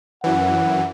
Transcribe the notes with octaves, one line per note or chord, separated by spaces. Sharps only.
F#2 E3 F#5